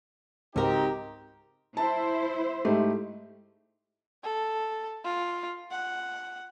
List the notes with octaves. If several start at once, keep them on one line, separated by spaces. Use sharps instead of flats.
C#2 G#2 C4 D#4 F#4 G4 A#4
E4 C5 A5
G#2 A3 G4
A4
F4
F#5